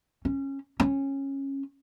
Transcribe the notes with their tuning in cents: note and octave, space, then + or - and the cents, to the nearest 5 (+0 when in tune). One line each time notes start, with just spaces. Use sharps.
C#4 -20
C#4 -15